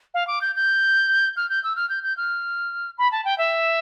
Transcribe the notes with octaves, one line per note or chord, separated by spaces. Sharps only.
F5
D6
G6
G6
F6
G6
E6
F6
G6
G6
F6
B5
A5
G5
E5